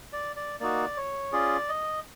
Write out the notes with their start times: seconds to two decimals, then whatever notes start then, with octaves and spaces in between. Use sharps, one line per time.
0.13 D5
0.36 D5
0.60 A#3 D#4 F#4 D5
0.97 C#5
1.32 C#4 F4 G#4 D5
1.69 D#5